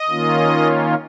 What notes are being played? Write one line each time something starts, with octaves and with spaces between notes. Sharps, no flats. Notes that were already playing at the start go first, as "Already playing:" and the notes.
Already playing: D#5
D#3 A#3 C#4 F4